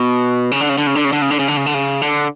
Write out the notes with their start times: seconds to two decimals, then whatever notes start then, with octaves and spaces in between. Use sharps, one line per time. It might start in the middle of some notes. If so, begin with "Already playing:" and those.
Already playing: B2
0.51 C#3
0.61 D3
0.69 C#3
0.78 D3
0.87 C#3
0.95 D3
1.05 C#3
1.13 D3
1.22 C#3
1.30 D3
1.39 C#3
1.48 D3
1.57 C#3
1.66 D3
1.74 C#3
2.02 D3